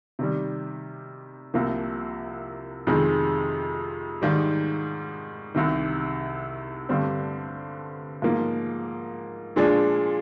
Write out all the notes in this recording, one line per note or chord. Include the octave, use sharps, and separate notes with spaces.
C3 D#3 G3
C2 C3 F3 A#3
F2 C3 D#3 G#3
G#2 D#3 G3
C2 C3 D#3
G2 D3 G3 C4
G#2 F3 A#3
A#2 F3 G#3 D4